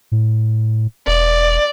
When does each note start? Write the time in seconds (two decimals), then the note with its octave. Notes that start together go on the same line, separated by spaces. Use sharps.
0.12 A2
1.07 E1 D5